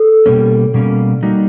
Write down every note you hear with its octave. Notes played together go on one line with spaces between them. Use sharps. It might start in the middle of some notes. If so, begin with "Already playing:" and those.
Already playing: A4
B2 G3 A#3 C#4
B2 G3 A#3 C#4
G3 A#3 D#4 F#4